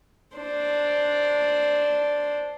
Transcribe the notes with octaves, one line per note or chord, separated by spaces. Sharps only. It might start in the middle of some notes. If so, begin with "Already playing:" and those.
D4 C5